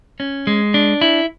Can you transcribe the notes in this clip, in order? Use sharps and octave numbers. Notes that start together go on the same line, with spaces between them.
C#4
G#3
D4
E4